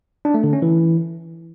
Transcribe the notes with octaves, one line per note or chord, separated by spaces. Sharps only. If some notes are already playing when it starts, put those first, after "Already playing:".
D4
A3
D3
C#4
E3